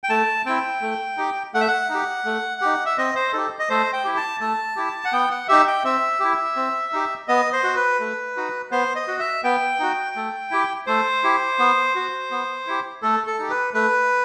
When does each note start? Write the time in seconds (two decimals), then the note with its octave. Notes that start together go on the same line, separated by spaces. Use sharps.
0.04 G5
0.10 A3 A5
0.46 C4 E4 G5
0.81 A3
1.17 D#4 G4
1.54 A3 F#5
1.61 E5
1.68 F#5
1.89 D#4
1.94 G4
2.25 A3
2.61 D#4 G4
2.86 E5
2.98 C4 D#5
3.15 C5
3.33 D#4 G4 A4
3.59 D#5
3.69 A3 C5
3.93 G5
4.05 E4 G4
4.17 A5
4.40 A3 A5
4.76 E4 G4
5.05 F#5
5.13 B3 G5
5.31 F#5
5.48 D#4 G4 E5
5.67 G5
5.84 C4 E5
6.20 E4 G4
6.56 C4
6.93 D#4 G4
7.28 B3 D#5
7.53 C5
7.64 F#4
7.76 B4
8.00 A3
8.36 D#4 F#4
8.71 B3 C5
8.95 D#5
9.08 F#4
9.20 E5
9.44 B3 G5
9.80 D#4 F#4
10.16 A3
10.51 E4 G4
10.87 A3 C5
11.23 E4 G4
11.59 B3
11.95 F#4
12.31 B3
12.67 E4 G4
13.02 A3 A4
13.27 A4
13.39 D#4 G4
13.50 B4
13.74 A3 B4